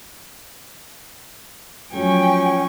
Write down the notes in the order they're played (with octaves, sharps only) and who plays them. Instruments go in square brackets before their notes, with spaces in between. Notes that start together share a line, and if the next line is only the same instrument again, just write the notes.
[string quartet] F3 G#5 C#6 [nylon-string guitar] F#3 A3 [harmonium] C#4 [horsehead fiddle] G5